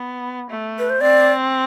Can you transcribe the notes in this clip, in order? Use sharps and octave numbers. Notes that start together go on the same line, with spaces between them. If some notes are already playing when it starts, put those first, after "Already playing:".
Already playing: B3
A3
B4
C5
C4 D5